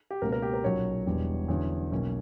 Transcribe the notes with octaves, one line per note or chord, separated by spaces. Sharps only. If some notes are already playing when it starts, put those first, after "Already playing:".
G4
C#2 B2 A#3 C#4 A#4
A#4
G4
A#4
B1 A#2 F#3 C#4 C#5
E1 E2 B2 G3
E2 D3 F#3 C#4
B1 B2 A#3 C#4